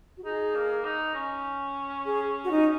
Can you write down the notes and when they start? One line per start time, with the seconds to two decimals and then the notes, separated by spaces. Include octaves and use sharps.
0.18 F#4
0.24 D#4 G#4
0.55 A#3
0.85 D#4
1.15 C#4
2.06 G#4
2.44 F#4
2.51 D#4